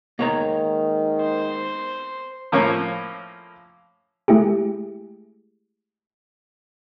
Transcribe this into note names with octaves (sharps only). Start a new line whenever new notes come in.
G#2 D#3 A#3 C#5 A#5
C5
A2 F3 A#3 C#4 C#6
G#3 A3 E4 G4 G#4